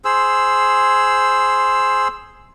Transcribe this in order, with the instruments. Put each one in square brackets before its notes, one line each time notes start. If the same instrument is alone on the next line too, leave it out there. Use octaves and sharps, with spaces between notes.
[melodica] G#4 C5 E6